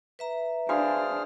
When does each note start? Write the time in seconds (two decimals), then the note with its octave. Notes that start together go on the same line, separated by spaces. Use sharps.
0.19 B4 E5 A#5
0.69 D4 F#4 G#4 C5 F5 G#5 F6